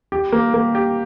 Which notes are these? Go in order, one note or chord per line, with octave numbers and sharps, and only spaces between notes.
G4
A#3
A#3
G4